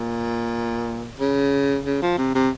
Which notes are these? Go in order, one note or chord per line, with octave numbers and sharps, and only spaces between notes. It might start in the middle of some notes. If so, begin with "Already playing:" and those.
Already playing: A#2
C#3
C#3
F3
C3
C3